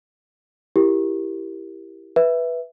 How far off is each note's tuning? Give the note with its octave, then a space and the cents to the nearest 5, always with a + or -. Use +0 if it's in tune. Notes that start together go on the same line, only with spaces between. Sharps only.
E4 +5 G4 +0 A#4 +0
B4 -5 E5 +0